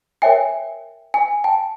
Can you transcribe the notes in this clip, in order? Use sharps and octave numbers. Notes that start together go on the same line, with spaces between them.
A#4 C#5 E5 G5 G#5
G#5
G5 A5